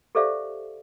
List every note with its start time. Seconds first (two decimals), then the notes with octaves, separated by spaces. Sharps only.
0.15 G4 A4 C5 D5 E5 F5